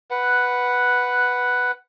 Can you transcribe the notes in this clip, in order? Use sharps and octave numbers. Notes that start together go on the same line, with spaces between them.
B4 F#5